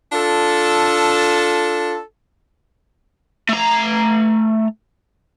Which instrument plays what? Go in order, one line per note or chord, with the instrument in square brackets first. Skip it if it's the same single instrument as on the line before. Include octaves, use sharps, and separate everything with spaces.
[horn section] D4 F4 A4
[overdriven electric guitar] A3 A#5